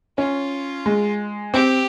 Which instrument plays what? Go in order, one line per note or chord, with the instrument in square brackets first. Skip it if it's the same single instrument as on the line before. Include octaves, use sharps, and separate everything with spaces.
[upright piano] C#4 [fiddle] F4
[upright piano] G#3
[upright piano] C4 [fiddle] G4